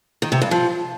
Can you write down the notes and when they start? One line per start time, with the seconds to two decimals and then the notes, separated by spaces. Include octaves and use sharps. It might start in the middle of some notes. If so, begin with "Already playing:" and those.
0.22 D#3
0.32 C3
0.42 G2
0.51 F3